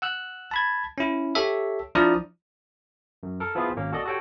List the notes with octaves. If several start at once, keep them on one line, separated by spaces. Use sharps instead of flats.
F#5 E6 F#6
A5 B5 G#6
C#4 E4
G4 A4 C#5 E5
F3 D4 E4 D5 A#5 D#6
F#2
A4 A#4
F3 B3 C4 E4 F4 G#4
G#1 A#3 C#4
F#4 A4 D5 D#5
F#4 G4 A4 C#5 G5